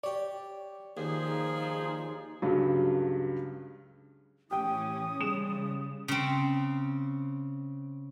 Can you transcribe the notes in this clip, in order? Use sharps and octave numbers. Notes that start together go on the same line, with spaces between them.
G4 C#5 D5
D#2 F3 D#4 G#4
C#2 G2 F#3
A2 E3 C#4 G4 G5 D#6
C#3 G3 G#3 E7
C#3 C4